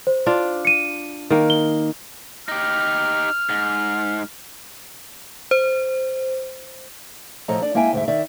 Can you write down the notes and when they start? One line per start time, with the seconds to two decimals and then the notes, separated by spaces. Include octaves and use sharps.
0.07 C5
0.26 D4 F4
0.65 C#7 D#7
1.30 D#3 A#3
1.50 G7
2.48 D#4 G4 F6
3.50 G#2
5.51 C5
7.48 A2 F3 A4 D#5 A#5
7.62 D4 D5
7.74 G#3 A#3 E4 E5 G5 G#5
7.93 D2 G#2 E5
8.08 D#3 D5 E5